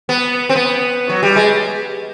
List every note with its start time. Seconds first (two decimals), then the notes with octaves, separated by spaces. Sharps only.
0.09 B3
0.49 C4
0.56 B3
1.09 F#3
1.23 G3
1.36 G#3